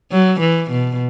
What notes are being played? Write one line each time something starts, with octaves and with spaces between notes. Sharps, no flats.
F#3
E3
B2